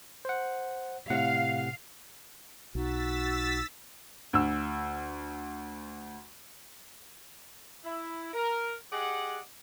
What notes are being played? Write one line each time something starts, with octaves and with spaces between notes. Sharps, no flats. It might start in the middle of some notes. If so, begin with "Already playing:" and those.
C5 F#5
A2 C3 F5 F#5
B1 D#4 F#4 E6 A6 B6
D2 E6
E4
A#4
G4 G#4 D5 D#5 F#5